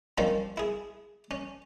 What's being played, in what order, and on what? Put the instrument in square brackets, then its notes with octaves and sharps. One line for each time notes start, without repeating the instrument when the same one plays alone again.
[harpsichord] D#3 F3 G3 C4 C#4
E4 G#4
C#4